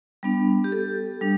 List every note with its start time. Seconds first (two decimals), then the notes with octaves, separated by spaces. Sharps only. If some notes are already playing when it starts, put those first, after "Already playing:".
0.23 G3 B3 D4
0.64 G4
0.72 A4
1.21 G3 D4